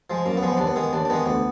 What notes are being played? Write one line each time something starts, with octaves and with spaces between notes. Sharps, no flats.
F3 G#3
F#2 A#3
B3
F3 G#3
B3
D#2 D4
B3
D#3 G#3
D#2 D4
D4
D#3 G#3 B3
D2 B3